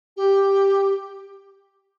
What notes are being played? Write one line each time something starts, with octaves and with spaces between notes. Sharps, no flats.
G4